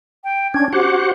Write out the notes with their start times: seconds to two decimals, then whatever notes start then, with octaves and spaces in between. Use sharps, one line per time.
0.24 G5
0.54 C#4 D4 G#6
0.73 F#4 G4 C5 F#5 D6